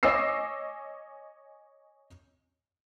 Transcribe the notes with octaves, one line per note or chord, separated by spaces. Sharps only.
C#5 D#5 G#5 D6 E6 C7